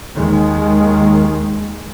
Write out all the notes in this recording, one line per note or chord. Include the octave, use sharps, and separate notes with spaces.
D#2 D#3 G#3